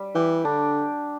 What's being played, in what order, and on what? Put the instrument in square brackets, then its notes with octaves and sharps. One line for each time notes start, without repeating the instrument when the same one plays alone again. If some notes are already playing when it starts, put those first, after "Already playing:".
Already playing: [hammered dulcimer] G3
[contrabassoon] E3 [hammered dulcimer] G4
[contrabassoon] D3 [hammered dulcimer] D4